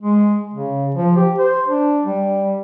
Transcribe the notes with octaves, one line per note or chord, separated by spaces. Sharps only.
G#3
C#3
F3
G4
C5
D4
G3